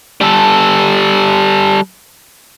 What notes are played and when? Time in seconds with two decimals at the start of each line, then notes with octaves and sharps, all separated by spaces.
0.21 G3 A4